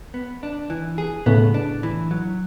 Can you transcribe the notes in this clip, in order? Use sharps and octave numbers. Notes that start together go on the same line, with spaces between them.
B3
D4
E3
G#4
A2 C#3 B3
D4
E3
F#3